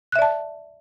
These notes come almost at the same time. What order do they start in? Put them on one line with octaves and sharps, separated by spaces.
F#6 E5 D5 A5